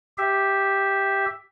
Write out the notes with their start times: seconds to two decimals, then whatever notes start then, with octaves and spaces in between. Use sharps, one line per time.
0.18 G4 E5